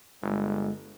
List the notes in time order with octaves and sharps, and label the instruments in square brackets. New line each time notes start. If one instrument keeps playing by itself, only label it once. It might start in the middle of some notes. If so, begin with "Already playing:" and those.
[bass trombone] G1 [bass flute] G#3